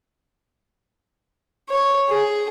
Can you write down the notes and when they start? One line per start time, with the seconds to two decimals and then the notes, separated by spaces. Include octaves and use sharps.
1.69 C#5
2.08 G#4